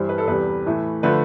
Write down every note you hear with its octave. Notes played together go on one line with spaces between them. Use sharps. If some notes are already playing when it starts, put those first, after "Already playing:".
Already playing: G2 E3 G3 C5
B4
A4
E2 C3 G3 B4
A2 E3 A3
D3 F3 A3 B4